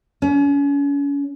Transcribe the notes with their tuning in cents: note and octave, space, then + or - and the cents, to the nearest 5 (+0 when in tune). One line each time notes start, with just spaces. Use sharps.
C#4 +35